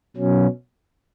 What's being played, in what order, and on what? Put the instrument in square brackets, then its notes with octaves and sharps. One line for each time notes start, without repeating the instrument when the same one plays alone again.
[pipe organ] B2 F#3 C#4